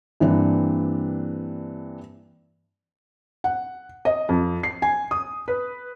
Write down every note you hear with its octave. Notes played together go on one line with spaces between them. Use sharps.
G2 E3 A#3 C4 D4
F#5
D#5
F2
C7
G#5
D#6
B4